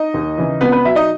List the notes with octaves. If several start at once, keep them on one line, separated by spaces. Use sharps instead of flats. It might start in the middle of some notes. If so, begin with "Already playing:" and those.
Already playing: D#4 D#5
D#2
C#3 E3
C#2 B3 B4
B3 B4
B2 F#3 E5
D#4 D#5